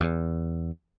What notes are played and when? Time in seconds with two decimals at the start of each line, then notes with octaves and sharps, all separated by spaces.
0.01 E2